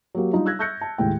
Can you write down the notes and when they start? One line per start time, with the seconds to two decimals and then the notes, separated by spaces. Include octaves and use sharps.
0.14 F#3 A#3 G4
0.33 G3 D4 D#4 F4
0.46 E6 F#6 G#6 A#6
0.59 C#6 E6 F#6 G6 A#6 C#7
0.81 A5
0.98 D#2 A2 G#3 G5